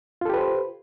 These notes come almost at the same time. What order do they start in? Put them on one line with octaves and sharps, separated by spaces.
F4 A4 G4 B4 C5